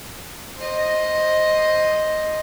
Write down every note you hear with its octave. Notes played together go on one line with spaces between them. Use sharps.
C5 D#5